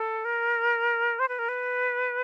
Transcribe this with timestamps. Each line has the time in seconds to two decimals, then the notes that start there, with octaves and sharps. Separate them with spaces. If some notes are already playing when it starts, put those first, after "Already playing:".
Already playing: A4
0.25 A#4
1.19 C5
1.28 B4
1.39 A#4
1.49 B4